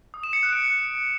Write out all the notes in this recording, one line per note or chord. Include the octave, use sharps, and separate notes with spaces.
D#6
E7
C#7
F#6
D7